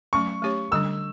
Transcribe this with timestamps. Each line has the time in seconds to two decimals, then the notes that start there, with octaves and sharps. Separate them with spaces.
0.13 F#3 A3 C#4 C#6
0.42 A3 C#4 G4 C#5
0.72 D3 G3 D4 E6